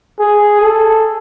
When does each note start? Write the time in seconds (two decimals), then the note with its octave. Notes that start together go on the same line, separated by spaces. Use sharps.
0.19 G#4
0.62 A4